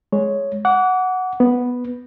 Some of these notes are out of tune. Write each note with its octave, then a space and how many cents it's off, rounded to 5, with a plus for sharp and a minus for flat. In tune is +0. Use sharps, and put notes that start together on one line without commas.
G#3 +0 C#5 +0
F#5 -5 D6 -35
B3 +0 B4 +0